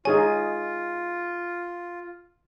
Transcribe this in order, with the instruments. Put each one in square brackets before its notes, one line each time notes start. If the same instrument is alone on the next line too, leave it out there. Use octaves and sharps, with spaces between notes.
[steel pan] D#4 G#4 C#5 [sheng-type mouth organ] F4 [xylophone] G#5